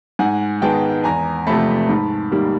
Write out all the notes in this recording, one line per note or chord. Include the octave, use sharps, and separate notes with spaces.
G#2 F#5 G#5
D#3 G#3 B3 G5 A5
E2 G#5 A#5
C3 F3 A3 A5 B5
G#2
D#3 G3 A#3